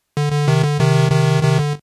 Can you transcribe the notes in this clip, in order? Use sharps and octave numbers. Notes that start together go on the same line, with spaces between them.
D3
D3
C3 D#3
D3
C3 D#3
C3 D#3
C3 D#3
D3